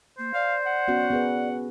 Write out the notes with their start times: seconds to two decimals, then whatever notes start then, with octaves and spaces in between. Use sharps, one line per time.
0.19 A#3 C5
0.34 D5 F5
0.66 F#5
0.88 B3 C#4 F#4
1.11 B3 G#4 B4